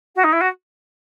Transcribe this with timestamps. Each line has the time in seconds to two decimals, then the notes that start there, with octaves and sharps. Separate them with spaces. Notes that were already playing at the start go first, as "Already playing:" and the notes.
0.15 F#4
0.23 D#4
0.32 E4
0.40 F#4